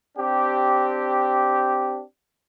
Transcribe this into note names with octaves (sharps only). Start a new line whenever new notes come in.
C4 D4 G4